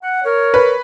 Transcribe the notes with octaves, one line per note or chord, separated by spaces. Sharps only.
F#5
A#4 C#5
B4